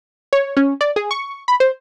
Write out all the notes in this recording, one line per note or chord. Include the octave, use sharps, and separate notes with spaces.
C#5
C#4
D5
G#4
C#6
B5
C5